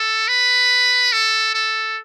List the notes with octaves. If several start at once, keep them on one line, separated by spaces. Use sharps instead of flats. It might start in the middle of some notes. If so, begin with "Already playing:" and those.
Already playing: A4
B4
A4
A4